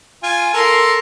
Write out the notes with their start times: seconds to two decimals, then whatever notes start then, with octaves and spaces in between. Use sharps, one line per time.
0.23 F4 G#5
0.53 A4 A#4 C6